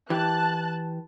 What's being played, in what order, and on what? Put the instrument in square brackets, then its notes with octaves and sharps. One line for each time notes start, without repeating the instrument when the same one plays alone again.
[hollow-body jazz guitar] E3 G4 [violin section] A5 F#6